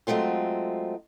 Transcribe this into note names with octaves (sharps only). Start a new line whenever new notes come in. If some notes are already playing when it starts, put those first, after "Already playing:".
F#3 G#3 A3 C4 F4